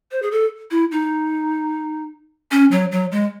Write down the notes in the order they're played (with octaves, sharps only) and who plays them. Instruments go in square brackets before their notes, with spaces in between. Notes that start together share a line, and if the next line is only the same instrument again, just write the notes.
[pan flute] C5
G#4
A4
E4
D#4
C#4
F#3
F#3
G#3